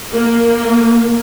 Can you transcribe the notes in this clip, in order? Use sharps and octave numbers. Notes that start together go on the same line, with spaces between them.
A#3